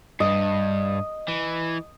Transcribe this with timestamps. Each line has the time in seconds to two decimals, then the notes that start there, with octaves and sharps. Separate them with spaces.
0.20 G2 D#5
1.28 E3